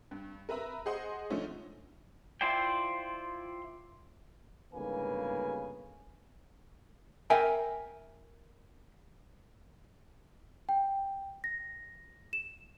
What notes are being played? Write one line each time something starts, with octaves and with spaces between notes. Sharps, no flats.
G2
A#4 B4 E5 A#5 B5
G#4 C5 D#5 F#5 C6 D#6
D3 F3 A3 C#4 D#4
E4 F4 C5 D5 G5
G1 G#2 C#3 A#3 B4 G#5
A#4 E5 G5 G#5
G5
A#6
E7